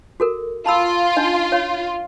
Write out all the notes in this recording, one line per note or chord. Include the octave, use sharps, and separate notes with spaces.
F#4 A4 A#4
F4 A5 B5 E6
D4 D#4 D#5
C#5 F5